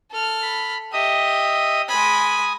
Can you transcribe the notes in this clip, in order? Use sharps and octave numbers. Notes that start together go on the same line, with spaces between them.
A4 F6
B5
G4 D#5 E5 D#6
G#3 G#5 B5 D#6